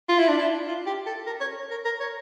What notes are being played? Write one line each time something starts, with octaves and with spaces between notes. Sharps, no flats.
F4
E4
D4
E4
F4
G4
A4
A#4
C#5
A#4
A#4
C#5